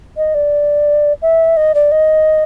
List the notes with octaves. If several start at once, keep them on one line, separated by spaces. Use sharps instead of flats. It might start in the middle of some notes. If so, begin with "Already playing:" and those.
D#5
D5
E5
D#5
D5
D#5